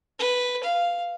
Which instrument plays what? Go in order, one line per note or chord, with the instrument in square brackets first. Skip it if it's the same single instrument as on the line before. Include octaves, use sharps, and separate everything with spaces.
[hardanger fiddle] B4
F5